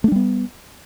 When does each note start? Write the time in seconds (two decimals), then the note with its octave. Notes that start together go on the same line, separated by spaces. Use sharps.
0.04 A3
0.08 D4
0.12 G3
0.16 B3